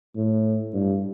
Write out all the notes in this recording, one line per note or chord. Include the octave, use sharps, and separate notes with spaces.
A2
G2